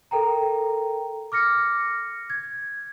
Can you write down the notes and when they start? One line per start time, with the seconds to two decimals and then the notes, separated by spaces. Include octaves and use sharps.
0.11 A4 A#4 G5 A#5
1.32 D6 F6 A#6 C#7
2.30 G#6